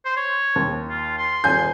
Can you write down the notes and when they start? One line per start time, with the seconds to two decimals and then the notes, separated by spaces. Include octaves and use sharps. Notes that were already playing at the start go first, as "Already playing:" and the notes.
0.05 C5
0.17 C#5
0.56 D#2
0.90 F4
1.18 C6
1.44 D#1 G#5 G6